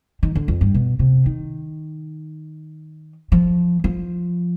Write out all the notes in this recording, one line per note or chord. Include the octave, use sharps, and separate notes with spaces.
D#3
D3
F2
G2
B2
C3
D#3
F3
F3